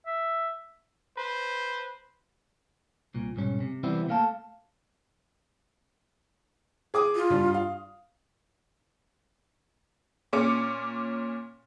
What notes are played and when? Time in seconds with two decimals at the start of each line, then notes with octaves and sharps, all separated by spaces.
0.07 E5
1.17 B4 C5
3.14 C2 A#2
3.36 B1 G#2 G3 C#4
3.60 C3
3.83 C3 E3 G3 B3 C4 E4
4.08 A3 A#3 F5 G5 A5
6.94 G#4 D6 D#6
7.15 F4
7.30 G2 G3
7.54 F5
10.33 A#2 C#4 D6 C#7